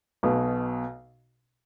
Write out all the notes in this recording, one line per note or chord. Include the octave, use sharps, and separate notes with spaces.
B1 B2